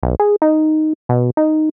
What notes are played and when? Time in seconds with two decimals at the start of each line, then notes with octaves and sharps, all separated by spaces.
0.03 B1
0.20 G#4
0.42 D#4
1.09 B2
1.37 D#4